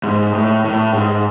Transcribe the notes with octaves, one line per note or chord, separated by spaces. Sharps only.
G#2
A2
A2
G#2